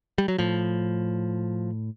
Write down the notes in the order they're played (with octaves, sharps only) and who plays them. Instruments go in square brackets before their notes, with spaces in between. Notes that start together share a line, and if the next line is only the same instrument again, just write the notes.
[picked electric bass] G3
F#3
A2 F3